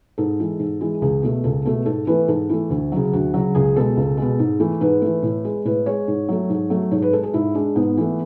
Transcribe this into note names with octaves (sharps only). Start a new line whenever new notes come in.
G#2 A4
E3 G#3
G#2
E3 G#3
C#2 G#4
B2 A3
C#2 A4
B2 A3 A4
G#2 A4
E3 A3 B4
G#2 A4
E3 A3
D2
C#3 F#3
D2 F#4
C#3 F#3
C#2 G#4
B2 G#3 A4
C#2
B2 G#3
G#2
E3 A3
G#2 B4
E3 A3
A2
G#3
A2 B4
G#3 C#5
G#2
F#3 A3
G#2
F#3 A3
G#2 C#5
B4
G#3 A4
G#4
G#2 E4
G#3 D4
G#2 B3
E3 A3